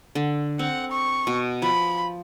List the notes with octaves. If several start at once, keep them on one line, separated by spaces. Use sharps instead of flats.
D3
C4 F#5
C#6
B2
F3 B5